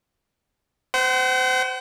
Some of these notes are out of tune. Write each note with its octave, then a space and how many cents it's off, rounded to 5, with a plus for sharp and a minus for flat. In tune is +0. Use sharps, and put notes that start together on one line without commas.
C5 -25 F#5 +40